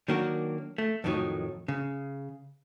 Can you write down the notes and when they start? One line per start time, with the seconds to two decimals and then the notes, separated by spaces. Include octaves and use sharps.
0.08 D#3 F#3 A#3 D4 F#4 A#4
0.78 A3
1.04 F2 A2 D#3 E3 F#3 D#4
1.68 C#3